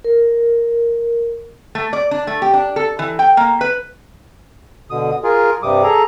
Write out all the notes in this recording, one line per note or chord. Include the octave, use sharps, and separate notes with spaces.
A#4
A3
D5
D4
A3
G4
D4
A4
E3
G5
A#3
B4
B2 D3 D#6
F4 G#4 A#4
G2 C3 G3 D6 D#6
G#4 A4 A#5